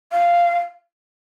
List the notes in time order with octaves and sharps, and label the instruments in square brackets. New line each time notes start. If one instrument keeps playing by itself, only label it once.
[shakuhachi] F5